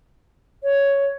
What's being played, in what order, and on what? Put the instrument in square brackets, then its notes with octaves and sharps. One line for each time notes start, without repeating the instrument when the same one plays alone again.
[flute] C#5